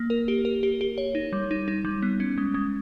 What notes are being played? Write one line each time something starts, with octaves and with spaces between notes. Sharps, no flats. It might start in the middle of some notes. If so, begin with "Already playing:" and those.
Already playing: A#3
A#4
G4
A#4
G4
G4
C#5
D#4
G3
D#4
D#4
G3
B3
C#4
G#3
G#3